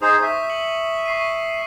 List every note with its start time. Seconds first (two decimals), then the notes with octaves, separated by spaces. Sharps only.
0.02 D#4 G#4 C5 D#6
0.22 E5 C#6
0.50 C#7 D#7 F#7
1.06 C#6 C7 D#7